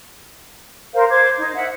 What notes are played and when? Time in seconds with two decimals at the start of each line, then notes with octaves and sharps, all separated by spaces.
0.94 A#4 C5 F5
1.09 C5 D6 G#6
1.39 D#4
1.55 E5 F#5